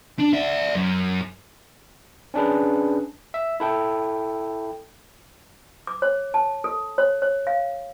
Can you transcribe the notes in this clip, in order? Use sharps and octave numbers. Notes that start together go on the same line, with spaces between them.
D4
D5 E5
F#2
C#4 D4 G#4 B4
E5
E4 A4 G5
D6
C#5
A5
A4
C#5
C#5
F5